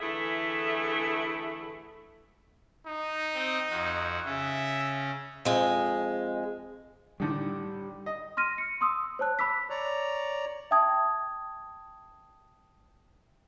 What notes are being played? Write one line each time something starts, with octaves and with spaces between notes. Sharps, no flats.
D3 E3 A3 E4 G#4 E5
D#4
C4 D#5
F2 F#4
C#3 C#4 E5
F2 G#3
A2 D3 D#3 G3
D#5
C6 F6 A#6 D#7
C#7
C6 D#6 E6
C5 C#5 A5 F#6
B5 D6 E6 B6
C#5 D5 A#5
E5 G5 A5 D#6 G#6